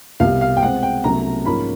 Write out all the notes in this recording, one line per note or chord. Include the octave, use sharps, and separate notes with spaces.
C2 B2 G3 F5
F5
G5
B2 G#3 C4 F#5
G5
C2 B2 F#3 A3 C#4 A#5
G#2 F3 A#3 C#4 B5